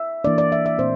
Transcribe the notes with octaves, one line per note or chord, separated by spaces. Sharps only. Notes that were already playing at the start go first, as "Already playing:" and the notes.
Already playing: E5
E3 A#3 D4 D5
D5
E5
E5
A#2 A3 C4 C5